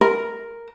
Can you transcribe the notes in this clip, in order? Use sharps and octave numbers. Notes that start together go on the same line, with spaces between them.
A#4